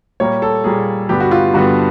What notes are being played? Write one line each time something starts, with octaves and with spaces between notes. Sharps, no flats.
A#2 G3 A#3 C#5
A4
A#2 G3 A#3 G#4
G2 D3 G3 B3 G4
F#4
F4
G2 D3 G3 B3 F#4